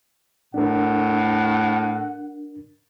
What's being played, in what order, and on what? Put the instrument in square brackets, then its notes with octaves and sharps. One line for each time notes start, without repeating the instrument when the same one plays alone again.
[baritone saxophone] A2 [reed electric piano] D4 A#4 [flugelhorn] F#5